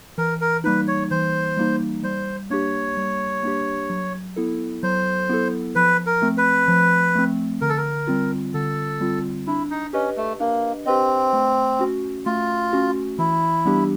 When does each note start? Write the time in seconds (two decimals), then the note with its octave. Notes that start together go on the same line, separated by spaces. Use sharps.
0.18 E3 A#4
0.41 A#4
0.64 G3 A#3 D#4 B4
0.87 C#5
1.11 E3 C5
1.57 G3 A#3 D#4
2.03 G3 C5
2.50 A#3 D4 G4 C#5
2.97 G3
3.43 A#3 D4 G4
3.90 F#3
4.36 B3 E4 A4
4.83 F#3 C5
5.29 B3 E4 A4
5.75 F3 B4
6.07 A#4
6.22 A3 C4
6.38 B4
6.68 F3
7.15 A3 C4
7.61 D3 A#4
7.69 A4
7.78 A#4
8.07 G3 C4 F4
8.54 D3 A4
9.01 G3 C4 F4
9.47 D4 E4
9.70 D#4
9.93 C#4 G4 B4 D#5
10.17 A3
10.40 A#3 D4
10.86 C4 G4 B4 D#5
11.33 A3
11.79 C#4 F#4
12.26 A3 F4
12.73 C#4 F#4
13.19 E3 E4
13.66 G3 B3 D4 G4